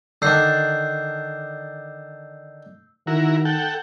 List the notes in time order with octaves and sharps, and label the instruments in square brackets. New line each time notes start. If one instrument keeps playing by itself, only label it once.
[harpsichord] D3 D#3 D4 [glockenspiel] E6 G6 C7
[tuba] D#3 [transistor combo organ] E4 F#4 A#4
[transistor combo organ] A4 F#5 G5